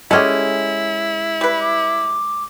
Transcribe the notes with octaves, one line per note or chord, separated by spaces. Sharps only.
G#3 C#4 E4 G4 A4 D#5
G3 B4
D6